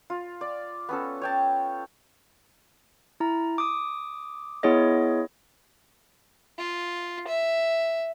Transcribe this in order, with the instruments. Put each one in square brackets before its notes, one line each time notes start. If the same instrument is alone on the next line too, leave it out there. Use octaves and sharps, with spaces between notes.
[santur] F4
D5
B3 C#4 A4
C#5 G5 A5
[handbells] E4 A#5
D6 D#6
B3 E4 G#4 C#5 D#5
[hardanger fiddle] F4
E5